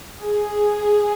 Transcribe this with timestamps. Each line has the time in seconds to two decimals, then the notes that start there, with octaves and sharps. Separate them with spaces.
0.21 G#4